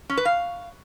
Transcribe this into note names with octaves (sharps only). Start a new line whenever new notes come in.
C#4
B4
F5